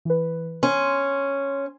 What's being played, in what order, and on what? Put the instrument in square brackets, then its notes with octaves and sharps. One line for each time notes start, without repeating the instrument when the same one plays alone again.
[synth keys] E3 B4
[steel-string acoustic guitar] C#4 [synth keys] C6